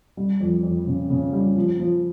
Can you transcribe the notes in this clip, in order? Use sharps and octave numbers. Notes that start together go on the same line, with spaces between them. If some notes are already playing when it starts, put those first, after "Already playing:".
G3
F2
F2
C#3
C#3
G3
F3
F3